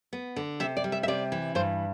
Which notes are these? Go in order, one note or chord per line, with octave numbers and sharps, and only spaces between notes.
B3
D3
C3 E5
D5
G3
E5
E5
C3 D5
E3
G2 C5